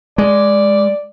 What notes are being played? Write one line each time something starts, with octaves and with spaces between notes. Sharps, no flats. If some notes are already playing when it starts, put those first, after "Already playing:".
G#3 D5